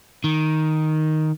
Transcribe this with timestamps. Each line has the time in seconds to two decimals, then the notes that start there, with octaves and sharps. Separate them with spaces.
0.24 D#3